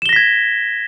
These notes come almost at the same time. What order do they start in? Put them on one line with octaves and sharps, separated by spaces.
E7 G7 A#6 B6 G#6